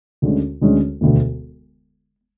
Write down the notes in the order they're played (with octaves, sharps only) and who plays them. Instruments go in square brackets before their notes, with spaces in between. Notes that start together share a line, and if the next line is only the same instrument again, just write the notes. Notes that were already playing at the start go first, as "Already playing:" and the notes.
[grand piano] D2 D3 G#3 C#4
D2 D3 G#3 C#4
E1 D2 D3